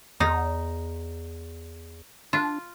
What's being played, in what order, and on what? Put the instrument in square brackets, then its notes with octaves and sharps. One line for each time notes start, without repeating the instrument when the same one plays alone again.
[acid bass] E2 [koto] D#4
[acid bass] D4 [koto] F4